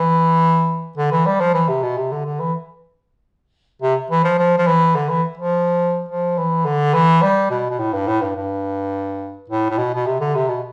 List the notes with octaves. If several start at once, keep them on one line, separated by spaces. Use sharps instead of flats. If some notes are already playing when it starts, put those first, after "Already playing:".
Already playing: E3
D3
E3
G3
F3
E3
C3
B2
C3
D3
D3
E3
C3
E3
F3
F3
F3
E3
D3
E3
F3
F3
E3
D3
E3
G3
B2
B2
A2
G2
A2
G2
G2
A2
A2
B2
B2
C3
D3
C3
B2